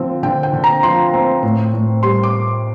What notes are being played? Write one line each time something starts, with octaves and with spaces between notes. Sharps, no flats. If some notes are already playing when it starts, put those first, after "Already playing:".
Already playing: D3 F3 C4
D3 G5
G5
D3
A#5
F3 C6
C4
A2
A2
G3 C6
D6